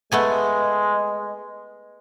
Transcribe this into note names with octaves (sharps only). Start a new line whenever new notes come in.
G#3 A3 B3 G#5